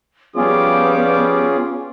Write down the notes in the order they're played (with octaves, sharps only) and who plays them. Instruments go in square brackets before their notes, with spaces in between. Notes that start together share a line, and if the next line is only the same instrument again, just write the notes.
[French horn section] F3 G3 [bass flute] B3 [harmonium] C#4 F4 G#4 [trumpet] D6